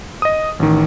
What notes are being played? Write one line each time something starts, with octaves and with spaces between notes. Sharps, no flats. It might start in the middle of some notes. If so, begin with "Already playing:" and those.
D#5 D#6
A1 D#3